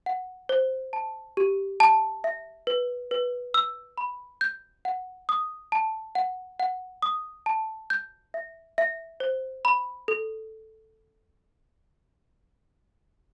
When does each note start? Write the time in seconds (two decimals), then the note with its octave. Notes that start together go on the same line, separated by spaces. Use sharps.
0.06 F#5
0.49 C5
0.93 A5
1.37 G4
1.80 A5
2.24 E5
2.67 B4
3.11 B4
3.54 E6
3.98 B5
4.41 G6
4.85 F#5
5.29 D#6
5.72 A5
6.15 F#5
6.60 F#5
7.02 D#6
7.46 A5
7.90 G6
8.34 E5
8.78 E5
9.20 C5
9.65 B5
10.08 A4